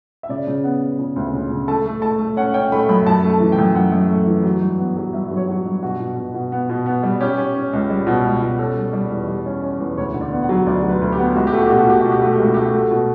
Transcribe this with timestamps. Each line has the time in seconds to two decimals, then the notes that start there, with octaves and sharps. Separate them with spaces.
0.23 E5
0.29 C#3 D5
0.47 C#3
0.64 B3
0.81 B3
0.99 C#3
1.16 D2
1.33 C#3
1.51 C#3
1.68 A3 A5
1.86 A3
2.02 A3 A5
2.19 A3
2.37 C#4 F#5
2.54 C#4 G5
2.72 A3 B5
2.89 F#2 B5
3.06 F#2 A5
3.24 A3
3.30 A5
3.40 E3
3.52 G5
3.59 F#2
3.75 F#2 F#5
3.92 F#2
4.09 A3
4.27 E3
4.44 F#3
4.62 G2
4.79 B3
4.97 F#3
5.13 G2 E5
5.31 F#3
5.37 C#5
5.48 F#3
5.65 G2
5.82 B2 F#4
6.00 B2
6.17 B2
6.34 B2
6.52 B3
6.69 B2
6.86 B3
7.03 G3
7.20 C#4 G4
7.38 C#4
7.55 C#4
7.73 C#2
7.90 G3
8.07 B2
8.24 C#2
8.42 B2
8.59 C#4 A4
8.77 G3
8.93 G3
9.11 E2
9.28 G3
9.46 C#4
9.63 C#4
9.80 E2
9.98 D2 C#5
10.14 D3
10.21 D5
10.31 B3
10.43 F#5
10.49 F#3
10.66 D2 D5
10.83 F#3
10.89 B4
11.02 D2
11.12 G4
11.18 B3
11.35 C#2 F#4
11.47 G4
11.53 A3 F#4
11.67 B2 G4
11.79 F#4
11.87 B2 G4
12.01 B2 F#4
12.12 G4
12.22 A3 F#4
12.33 G4
12.39 C#2
12.44 F#4
12.54 A3 G4
12.66 F#4
12.74 A3
12.91 B2